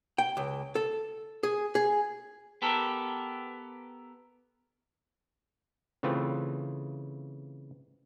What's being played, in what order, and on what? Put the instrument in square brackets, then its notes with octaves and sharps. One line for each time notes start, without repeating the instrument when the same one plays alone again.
[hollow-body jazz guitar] G5
C#2
A4
G#4
G#4
[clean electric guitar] B3 G4 A4 A#4
[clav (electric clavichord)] C#3 E3 A3 C4 F4